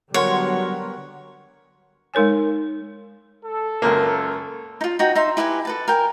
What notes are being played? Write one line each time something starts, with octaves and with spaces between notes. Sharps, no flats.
D3 F#3 G3 B3 A#4 C#5 F#5 C6
G#3 D#4 A#4 C#5 G#5
A4
C#2 F#2 A#3
D#4 F4
D#4 F#4 G5
D#4 E5 C6
E4 G4 B4 G#5
A4 B4 A5
A#4 G5 G#5